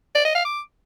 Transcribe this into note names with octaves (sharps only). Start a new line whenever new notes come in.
D5
D#5
F5
D6